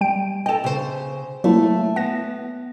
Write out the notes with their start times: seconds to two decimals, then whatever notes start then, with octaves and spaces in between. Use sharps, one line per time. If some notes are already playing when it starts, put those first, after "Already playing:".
0.01 G3 G5 D7
0.46 A4 D#5 G5 E7
0.64 C#3 C5
1.44 F#3 A3 A#3 E4
1.96 B3 F#5 A#6 E7